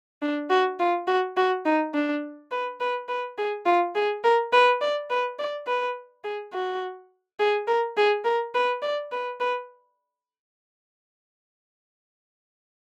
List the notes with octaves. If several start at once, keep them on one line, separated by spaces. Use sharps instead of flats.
D4
F#4
F4
F#4
F#4
D#4
D4
B4
B4
B4
G#4
F4
G#4
A#4
B4
D5
B4
D5
B4
G#4
F#4
G#4
A#4
G#4
A#4
B4
D5
B4
B4